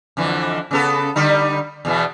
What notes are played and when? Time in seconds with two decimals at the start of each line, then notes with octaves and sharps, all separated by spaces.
0.17 F2 D3 E3
0.71 C#3 B3 A4
1.16 D3 G3 D#4
1.85 E2 B2 E3